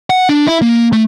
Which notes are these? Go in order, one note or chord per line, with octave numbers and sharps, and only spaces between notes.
F#5
D4
E4
A#3
A3